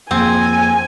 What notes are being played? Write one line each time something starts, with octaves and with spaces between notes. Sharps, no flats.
F2 A#3 C4 G#4 G#5